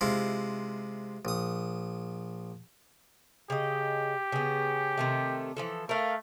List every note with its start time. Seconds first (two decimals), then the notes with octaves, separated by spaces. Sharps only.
0.01 C3 G#3 E4 F4
1.25 A#1 D#6
3.50 C#3 G4 D#5
4.32 C#3 B3
4.97 C3 D#3 A3
5.57 E3 F3 A4
5.89 A3 A#4 F5